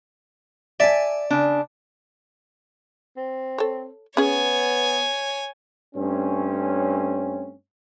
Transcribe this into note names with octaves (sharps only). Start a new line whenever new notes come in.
D5 E5 G#5 A5
C#3 D4
C4
A4 C#5
B3 C#4 G#4 C#5 G#5
G2 A3 C4 C#4